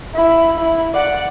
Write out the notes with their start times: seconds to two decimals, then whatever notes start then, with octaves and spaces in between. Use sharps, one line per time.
0.16 E4
0.58 E4
0.94 D5 F#5